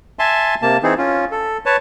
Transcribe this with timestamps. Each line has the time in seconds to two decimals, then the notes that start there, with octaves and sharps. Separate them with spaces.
0.19 E5 G#5 A5 C6
0.62 C3 A#3 A5
0.83 E3 C4 D#4 G#4
0.98 C#4 F4
1.32 A4
1.66 B4 C#5 A5